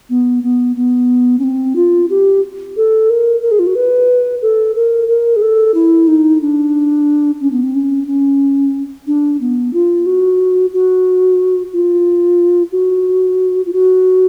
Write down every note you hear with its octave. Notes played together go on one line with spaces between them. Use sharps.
B3
B3
B3
C#4
C4
F4
G4
A4
A#4
A#4
G#4
F4
F#4
B4
A4
A#4
A#4
G#4
A4
E4
D#4
D4
C#4
B3
C4
C#4
C#4
D4
B3
F4
F#4
F#4
F4
F#4
F4
F#4